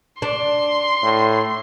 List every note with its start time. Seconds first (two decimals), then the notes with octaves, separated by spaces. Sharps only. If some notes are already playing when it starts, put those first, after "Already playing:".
0.22 D4 C6
1.03 A2